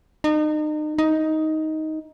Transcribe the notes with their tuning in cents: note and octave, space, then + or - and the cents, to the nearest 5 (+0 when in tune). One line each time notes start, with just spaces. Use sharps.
D#4 -35
D#4 +10